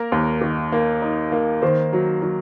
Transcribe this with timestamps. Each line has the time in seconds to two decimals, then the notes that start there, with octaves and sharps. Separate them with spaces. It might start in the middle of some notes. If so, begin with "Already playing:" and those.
Already playing: A#3 A#4
0.12 D#2
0.41 D#3
0.72 A#3
1.02 D#4
1.32 A#3
1.62 D#3 C5
1.93 F#3
2.22 F#3